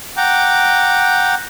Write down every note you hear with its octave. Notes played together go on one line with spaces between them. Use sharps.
F#5 G5 A#5 D6